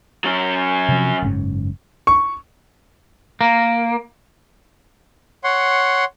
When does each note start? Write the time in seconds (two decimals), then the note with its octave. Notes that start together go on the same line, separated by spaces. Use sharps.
0.24 F#3 C#4
0.88 C3 F3
1.22 F#1 G#2 C#4
2.07 C#6
3.41 A#3
5.44 C#5 F#5 C6